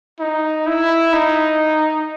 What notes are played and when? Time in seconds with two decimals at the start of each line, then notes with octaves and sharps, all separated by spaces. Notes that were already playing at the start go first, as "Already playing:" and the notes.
0.20 D#4
0.67 E4
1.13 D#4